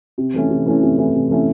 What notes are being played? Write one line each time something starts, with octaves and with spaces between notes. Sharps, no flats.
C3
E3 A3 C#4 E4
C3
E3 A3 C#4 E4
C3
E3 A3 C#4 E4
C3
E3 A3 C#4 E4